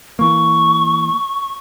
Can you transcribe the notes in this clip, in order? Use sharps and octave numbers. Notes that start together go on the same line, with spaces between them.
E3 A#3 C#6